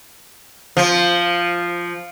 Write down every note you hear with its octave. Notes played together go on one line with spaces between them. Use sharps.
F3